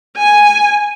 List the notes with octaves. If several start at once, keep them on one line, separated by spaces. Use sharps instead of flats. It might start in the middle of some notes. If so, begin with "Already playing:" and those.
G#5